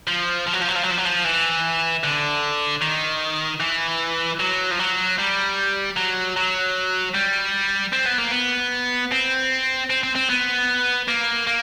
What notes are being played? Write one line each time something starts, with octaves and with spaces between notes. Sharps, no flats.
F3
F3
F#3
F3
F#3
F3
F#3
F3
F#3
F3
E3
D3
D#3
E3
F#3
F3
F#3
G3
F#3
F#3
G3
C4
B3
A#3
B3
C4
C4
C4
C4
B3
A#3
A#3